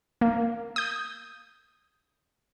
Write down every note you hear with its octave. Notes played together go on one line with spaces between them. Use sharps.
A#3
D#6 G6